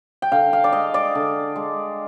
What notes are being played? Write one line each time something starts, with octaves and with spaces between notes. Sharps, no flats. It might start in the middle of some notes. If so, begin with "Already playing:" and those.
G5
D3 F5
F5
D5
G#3 D#5
D5
D3
G#3